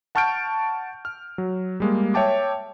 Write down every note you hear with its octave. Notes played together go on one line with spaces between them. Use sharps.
F#5 A5 C#6 F6 G6 D7
F6
F#3
G3 G#3 A#3
C#5 E5 G5 A5 D6